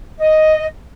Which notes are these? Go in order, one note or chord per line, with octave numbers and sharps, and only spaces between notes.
D#5